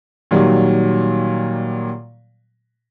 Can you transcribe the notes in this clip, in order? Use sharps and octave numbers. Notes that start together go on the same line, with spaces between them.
A#2 D#3 F#3 G3